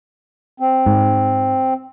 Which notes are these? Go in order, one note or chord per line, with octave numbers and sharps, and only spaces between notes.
C4
G#2